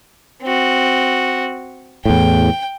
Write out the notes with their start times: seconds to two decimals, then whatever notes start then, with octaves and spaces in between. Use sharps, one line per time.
0.43 C4 F#4
2.05 E2 A2 G5